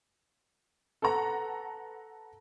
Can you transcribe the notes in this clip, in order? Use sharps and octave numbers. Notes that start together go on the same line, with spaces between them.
A4 B4 F#5 A#5